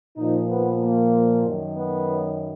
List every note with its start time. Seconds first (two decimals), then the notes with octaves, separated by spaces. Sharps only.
0.17 A#2 F3 D#4
0.49 B3
0.81 A#3
1.44 F#2 D#3 F#3
1.76 B3